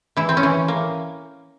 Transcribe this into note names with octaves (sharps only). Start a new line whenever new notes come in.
E3 E4
C4
C#4
E3
A#3